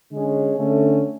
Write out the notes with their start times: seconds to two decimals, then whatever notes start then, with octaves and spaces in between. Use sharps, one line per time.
0.10 D3 G#3 C#4 G#4
0.56 D3 A3 C#4